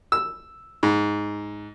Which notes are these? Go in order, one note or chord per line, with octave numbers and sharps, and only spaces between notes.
E6
G#2